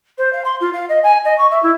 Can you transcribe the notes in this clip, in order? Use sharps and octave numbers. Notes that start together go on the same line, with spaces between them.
C5
F5
C6
F4
F5
D#5
G#5
D#5
C#6
E5
E4